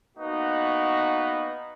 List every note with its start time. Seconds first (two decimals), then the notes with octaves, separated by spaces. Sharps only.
0.18 A#3 B3 D#4 F#4 B4